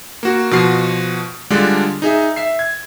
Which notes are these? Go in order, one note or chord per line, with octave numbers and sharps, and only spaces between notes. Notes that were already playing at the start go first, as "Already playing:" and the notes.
A#3 F#4
B2 F3 F#4 C7
D3 G3 G#3 D4 F4
D#4 G#4 E5
E5 C7
G#6